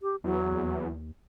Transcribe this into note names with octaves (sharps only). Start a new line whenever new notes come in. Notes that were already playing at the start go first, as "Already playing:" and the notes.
G4
E2 F#3
D#2